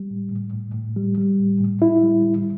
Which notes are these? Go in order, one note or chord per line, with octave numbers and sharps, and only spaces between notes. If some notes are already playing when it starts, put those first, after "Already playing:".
Already playing: G3
A2
A2
A2
A2
G3
G3
A2
A2
A2 E4
G3
A2